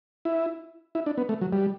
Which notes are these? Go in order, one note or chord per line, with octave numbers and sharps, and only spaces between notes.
E4
E4
D4
B3
A3
F#3
G3